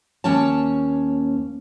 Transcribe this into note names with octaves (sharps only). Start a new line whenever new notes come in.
D#2 A#3 C#4 C#5 A5